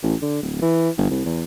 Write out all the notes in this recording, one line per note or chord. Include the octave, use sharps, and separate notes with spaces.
A1
D3
D1
E3
G1
C2
E2